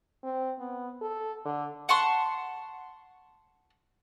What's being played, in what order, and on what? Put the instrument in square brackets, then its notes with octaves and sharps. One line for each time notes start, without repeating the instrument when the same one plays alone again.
[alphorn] C4
B3
A4
D3
[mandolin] F#5 A5 C6 C#6